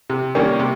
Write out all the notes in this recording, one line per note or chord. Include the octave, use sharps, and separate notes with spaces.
C3
D#3 G3 A#3 C#4
C3